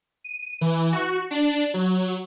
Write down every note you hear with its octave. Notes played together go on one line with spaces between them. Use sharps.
D#7
E3
F#4
D4
F#3